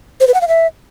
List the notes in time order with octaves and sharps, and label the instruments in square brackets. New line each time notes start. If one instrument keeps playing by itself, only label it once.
[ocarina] C5
B4
F#5
F5
E5